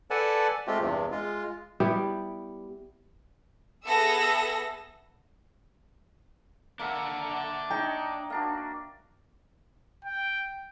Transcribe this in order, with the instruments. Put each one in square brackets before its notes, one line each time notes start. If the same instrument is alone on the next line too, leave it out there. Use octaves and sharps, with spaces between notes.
[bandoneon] A4 B4 D5 F#5 G#5 A5
G#3 A3 C4 F4 G4
E2 G2 C3
G#3 F4
[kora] G3 B3 E4 G4
[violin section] B3 G#4 A4 E5 E6 A#6
[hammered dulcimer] A#3 E5 [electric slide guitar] D4 F#5
[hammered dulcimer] D#4 C#5 [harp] G5
[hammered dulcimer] A#3 D4 F#4
[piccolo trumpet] G5